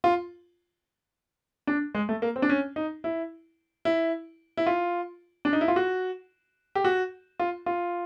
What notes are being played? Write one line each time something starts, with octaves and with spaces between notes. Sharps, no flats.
F4
D4
G#3
A3
A#3
C4
D4
C#4
D#4
E4
E4
E4
F4
D4
D#4
E4
F4
F#4
G4
F#4
F4
F4